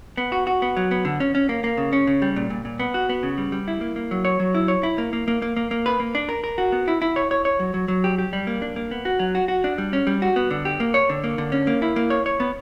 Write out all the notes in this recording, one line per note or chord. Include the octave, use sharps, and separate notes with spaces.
B3
F#4
F#4
B3
F#3
B3
D3
C#4
C#4
A#3
A#3
C#3
C#4
C#3
G3
A#2
A#2
A#2
B3
F#4
B3
C#3
G3
G3
E4
A#3
A#3
F#3
C#5
F#3
E4
C#5
E4
A#3
A#3
A#3
A#3
A#3
A#3
B4
A#3
D4
A#4
A#4
F#4
B3
E4
E4
C#5
C#5
C#5
F#3
F#3
F#3
G4
G4
G3
A#3
D4
A#3
B3
F#4
F#3
F#4
F#4
D4
G3
C#4
G3
F#4
B3
D3
G4
A#3
C#5
D3
A#3
D3
C#4
A#3
E4
A#3
C#5
C#5
B3